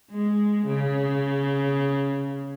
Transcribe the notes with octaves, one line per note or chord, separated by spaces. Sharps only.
G#3
C#3